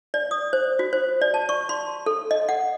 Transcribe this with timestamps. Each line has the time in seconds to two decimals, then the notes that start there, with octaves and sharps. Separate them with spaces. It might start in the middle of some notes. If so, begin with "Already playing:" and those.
0.14 D5
0.31 D#6
0.53 C5
0.79 F#4
0.93 C5
1.21 D5
1.34 A5
1.49 C#6
1.69 C6
2.06 A4
2.31 D#5
2.49 F#5